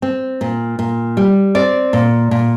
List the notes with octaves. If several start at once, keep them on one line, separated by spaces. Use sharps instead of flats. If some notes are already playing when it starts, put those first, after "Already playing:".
C4
A#2
A#2
G3
C4 D5
A#2
A#2